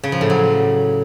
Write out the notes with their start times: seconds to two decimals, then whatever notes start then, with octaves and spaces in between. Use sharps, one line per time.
0.04 C#3
0.12 F3
0.21 A2
0.30 F#3